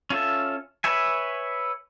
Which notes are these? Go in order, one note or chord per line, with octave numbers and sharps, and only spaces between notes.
C#4 F4 A4 E5
B4 C#5 E5 G#5